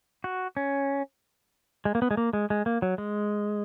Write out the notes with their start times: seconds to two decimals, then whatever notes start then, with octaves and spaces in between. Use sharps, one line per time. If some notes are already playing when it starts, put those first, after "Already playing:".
0.24 F#4
0.57 C#4
1.85 G#3
1.95 A#3
2.02 B3
2.11 G#3
2.17 A#3
2.33 G#3
2.50 G#3
2.66 A#3
2.82 F#3
2.98 G#3